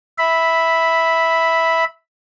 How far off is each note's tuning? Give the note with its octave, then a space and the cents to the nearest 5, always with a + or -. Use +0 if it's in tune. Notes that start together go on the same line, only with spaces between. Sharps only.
E5 -10 B5 +0